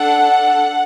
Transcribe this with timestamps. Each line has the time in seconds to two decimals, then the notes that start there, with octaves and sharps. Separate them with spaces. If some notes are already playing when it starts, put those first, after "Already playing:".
Already playing: D4 A4 F#5